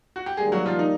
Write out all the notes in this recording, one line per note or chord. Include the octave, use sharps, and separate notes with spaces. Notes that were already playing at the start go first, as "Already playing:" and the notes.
F#4
G4
D#3 G3 G#3 A#3 G#4
F#3 F#4
F3 F4
D#4